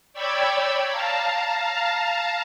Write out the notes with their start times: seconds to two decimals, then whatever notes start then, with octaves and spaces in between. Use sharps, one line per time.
0.13 C#5 D5 G5 B5 E6 G#6
0.90 F5 A5 A#5